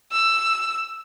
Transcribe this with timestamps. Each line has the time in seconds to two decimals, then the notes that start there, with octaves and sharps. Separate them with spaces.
0.12 E6